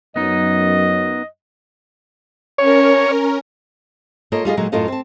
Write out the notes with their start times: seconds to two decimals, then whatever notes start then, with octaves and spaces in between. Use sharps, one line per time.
0.16 F#2 B3 D#4 D#5
2.58 C#4 A#4 C#5
4.32 A#3 F4 A4 C#5 D#5
4.45 G3 F4 G#4 D#5
4.57 A#2 D3 F#3 G#3
4.72 F#2 A2 F4 A4 D#5 F5
4.88 C4 A5